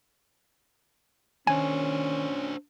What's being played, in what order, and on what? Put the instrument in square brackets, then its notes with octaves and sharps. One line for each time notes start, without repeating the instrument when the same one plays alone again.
[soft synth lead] D#3 [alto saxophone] C#4 [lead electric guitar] D4 C5 [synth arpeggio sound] G#5